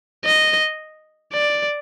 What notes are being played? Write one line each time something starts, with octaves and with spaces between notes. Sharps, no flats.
D#5
D5